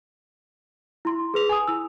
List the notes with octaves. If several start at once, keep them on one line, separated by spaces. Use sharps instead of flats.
E4 C6
G#4 B4 F7
G#5 D#6
E4 E6